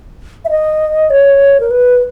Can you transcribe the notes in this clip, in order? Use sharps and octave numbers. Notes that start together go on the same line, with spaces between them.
E5
D#5
C#5
A#4
B4